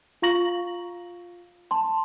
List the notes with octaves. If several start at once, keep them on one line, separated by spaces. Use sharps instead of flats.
F4 F5 A#5 C#6 A#6 F#7
A5 C6